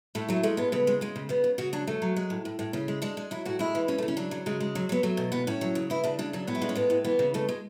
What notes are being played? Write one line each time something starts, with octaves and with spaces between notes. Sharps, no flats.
A2 A3
F#3 A3
G#3 A3
A2 B3
C#3 B3
G#3
C#3 G#3
C#3
C#3 B3
C#3
C#3 F#4
F#3 D4
F#3 A3
F#3
G#3
A2
A2
A2
C#3 C#4
G#3
G#3 D4
G#3
F#3 E4
A2 F#4
G#3 E4
E3
C#3 C#4
A3
C#3
C#4
F#3 D4
F#3
C#3 G#3
G#3
F#3
F#3 B3
F#3 A3
B2
A2 B3
A2 C#4
F#3
C#3
E3 E4
C#3 D4
C#3 D4
F#3 D4
A2 B3
E4
G#3 D4
C#4
A2 B3
A2
E3 B3
C#3
B2 A3
G#3